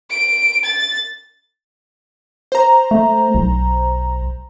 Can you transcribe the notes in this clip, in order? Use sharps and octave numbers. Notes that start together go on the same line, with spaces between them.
D7
A6
C5 A#5
A3
B1